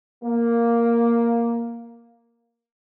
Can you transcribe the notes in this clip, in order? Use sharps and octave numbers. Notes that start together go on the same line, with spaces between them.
A#3